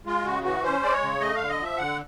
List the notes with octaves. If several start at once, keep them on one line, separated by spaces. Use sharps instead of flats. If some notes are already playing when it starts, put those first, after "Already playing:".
G#3 F4
C#3 F#4
E3 F#4
C#4 C5
G#3 D5
C#5
C#3
A3 D#5
D3 F5
D#5
F3 E5
D3 F#5